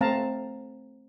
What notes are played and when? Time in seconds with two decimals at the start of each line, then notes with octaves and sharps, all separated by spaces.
0.01 A3 C4 F5 A5 A#5